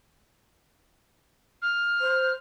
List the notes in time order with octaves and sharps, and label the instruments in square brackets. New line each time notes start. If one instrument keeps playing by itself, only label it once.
[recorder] F6
[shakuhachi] C5